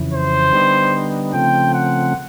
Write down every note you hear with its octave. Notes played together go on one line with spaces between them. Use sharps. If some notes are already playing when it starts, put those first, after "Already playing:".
Already playing: F2 C#3 E3
C5
D3 G3 B3 D#4
C#3 F3 A3 C4 G5
F#5